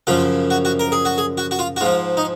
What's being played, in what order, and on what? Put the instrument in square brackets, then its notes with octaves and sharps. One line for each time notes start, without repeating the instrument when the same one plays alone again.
[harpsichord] F#2 C#3 F3 F4
F#4
F#4
A#4
G#4
F#4
G#4
F#4
F#4
F4
F#4
G#2 F3 F4
D#4